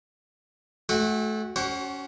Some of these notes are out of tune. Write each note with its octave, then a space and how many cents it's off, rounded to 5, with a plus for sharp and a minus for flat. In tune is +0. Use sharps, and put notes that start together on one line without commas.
A3 -25 F#4 +0 G5 +45
C#4 +15 F#4 +30 C5 +45